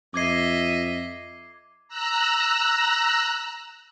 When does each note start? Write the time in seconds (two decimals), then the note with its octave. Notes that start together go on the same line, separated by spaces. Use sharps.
0.14 F2 D#5 E5 D6 G#6 C7
1.88 A#5 E6 F#6